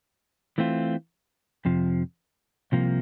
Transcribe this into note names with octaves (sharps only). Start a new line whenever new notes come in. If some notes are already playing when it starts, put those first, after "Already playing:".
E3 A3 C4 F4
F2 C3 F3
C2 C3 F3 A#3